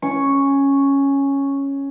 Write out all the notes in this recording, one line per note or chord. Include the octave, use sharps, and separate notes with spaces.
C#4 C#6